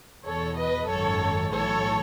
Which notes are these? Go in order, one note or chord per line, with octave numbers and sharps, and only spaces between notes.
E2 B2 A4 C#5
B4 D#5
G#1 F#2 D#3 A4 C#5
B1 A2 E3 A4 C#5